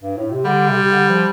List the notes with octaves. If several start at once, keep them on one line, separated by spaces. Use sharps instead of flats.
G2
A2
C3
D3 G3
C3
C3
D3
F3